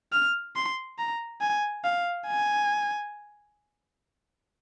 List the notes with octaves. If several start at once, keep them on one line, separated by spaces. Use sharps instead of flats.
F6
C6
A#5
G#5
F5
G#5